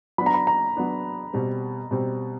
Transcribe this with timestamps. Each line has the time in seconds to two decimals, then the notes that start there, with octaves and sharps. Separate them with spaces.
0.18 F#3 B3 D4 B5
0.26 A#5
0.34 B5
0.47 A#5
0.77 F#3 B3 D4
1.33 B2 G3 C4
1.91 B2 G3 C4